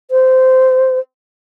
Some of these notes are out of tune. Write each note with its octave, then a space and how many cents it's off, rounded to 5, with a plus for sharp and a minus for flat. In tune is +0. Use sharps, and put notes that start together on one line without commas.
C5 -15